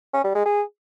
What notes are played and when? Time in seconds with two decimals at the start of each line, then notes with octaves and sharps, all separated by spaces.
0.14 C#4
0.24 G3
0.35 G#3
0.45 G#4